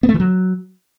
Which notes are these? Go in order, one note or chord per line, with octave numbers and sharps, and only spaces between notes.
B3
A3
E3
F#3